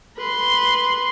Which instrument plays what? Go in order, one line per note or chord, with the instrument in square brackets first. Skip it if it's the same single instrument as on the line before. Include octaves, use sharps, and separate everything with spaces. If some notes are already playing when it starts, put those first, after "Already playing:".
[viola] B4 C6